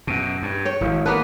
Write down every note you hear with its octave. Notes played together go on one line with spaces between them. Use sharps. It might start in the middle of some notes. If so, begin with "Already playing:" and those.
F#2 B2
G2
C#5 G5
D#1 G#1 E4 F5
A#3 B3 B4 A5